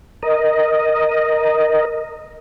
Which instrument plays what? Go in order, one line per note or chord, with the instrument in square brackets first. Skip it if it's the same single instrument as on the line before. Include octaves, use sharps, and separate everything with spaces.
[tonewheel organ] A#4 D#5